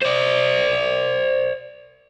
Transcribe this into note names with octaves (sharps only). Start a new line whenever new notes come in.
C5 D5